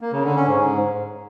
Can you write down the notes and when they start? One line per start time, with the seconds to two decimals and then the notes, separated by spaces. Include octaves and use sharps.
0.01 A#3
0.13 C#3
0.24 D3
0.36 C#4
0.48 G#2